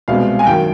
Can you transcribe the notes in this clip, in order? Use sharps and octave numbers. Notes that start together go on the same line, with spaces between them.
C2 B2 G#3 C4 F5
G#5
F#2 D#3 F#3 G5